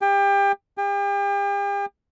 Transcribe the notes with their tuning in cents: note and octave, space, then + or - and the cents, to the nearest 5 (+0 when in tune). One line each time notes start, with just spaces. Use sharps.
G4 +30
G4 +40